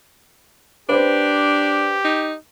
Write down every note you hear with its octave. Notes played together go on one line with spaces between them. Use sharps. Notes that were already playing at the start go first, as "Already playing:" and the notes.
D4 G4 B4 C5
D#4